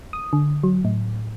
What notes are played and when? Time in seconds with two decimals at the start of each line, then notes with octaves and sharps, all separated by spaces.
0.13 D#6
0.33 D3
0.63 F#3
0.85 A2